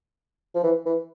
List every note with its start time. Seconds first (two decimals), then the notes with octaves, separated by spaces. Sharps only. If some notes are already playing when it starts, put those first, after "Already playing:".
0.55 F3
0.63 E3
0.86 E3